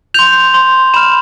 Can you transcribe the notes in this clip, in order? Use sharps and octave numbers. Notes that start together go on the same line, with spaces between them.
C6 G6 F7
C6 G6
B5 F6 E7